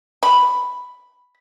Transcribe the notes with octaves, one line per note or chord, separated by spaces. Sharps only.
B5